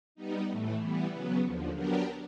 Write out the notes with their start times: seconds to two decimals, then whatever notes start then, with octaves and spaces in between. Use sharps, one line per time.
0.15 G3 B3 D#4
0.48 A2 E3 A3
0.79 E3 G3 B3
1.11 C#3 F#3 B3
1.43 D#2 D3 F3
1.75 F#3 B3 D4 G4 A#4